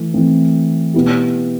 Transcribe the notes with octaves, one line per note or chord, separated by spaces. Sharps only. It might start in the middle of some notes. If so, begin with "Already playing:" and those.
Already playing: E3 A3
E3 A3 C4
B2 B3 E4 G4